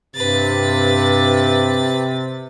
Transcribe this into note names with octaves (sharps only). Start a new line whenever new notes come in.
G2 C3 B4 A6